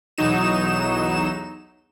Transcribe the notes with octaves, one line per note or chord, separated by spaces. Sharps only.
B1 E2 F#3 D#4 E7